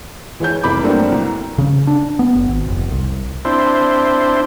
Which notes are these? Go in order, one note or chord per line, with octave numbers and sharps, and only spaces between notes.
E3 G#3 C#5 G6
F1 C2 B5 D6
G2 F#3 A3 A#3 C4 D4
C2
C#3
D4
B3
F#1
G#1
F1
C2
C4 D4 E4 C5